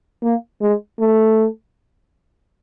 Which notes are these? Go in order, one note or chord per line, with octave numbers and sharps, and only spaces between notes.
A#3
G#3
A3